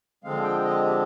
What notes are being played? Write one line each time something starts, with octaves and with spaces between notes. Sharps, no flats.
D3 F3 G#3 C4 F5
G5
D#5
G4